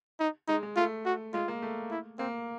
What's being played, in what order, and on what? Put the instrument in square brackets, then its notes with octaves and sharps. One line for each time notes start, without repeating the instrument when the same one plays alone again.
[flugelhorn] D#4
[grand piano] G#3 [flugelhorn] D#4
[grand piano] G#3
[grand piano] A3 [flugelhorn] F4
[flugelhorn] F#4
[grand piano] G#3 [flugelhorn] F4
[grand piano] A#3
A3
[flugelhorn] E4
[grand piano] A#3 [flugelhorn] C4